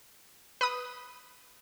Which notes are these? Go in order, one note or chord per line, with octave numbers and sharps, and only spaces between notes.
B4 B5 D#6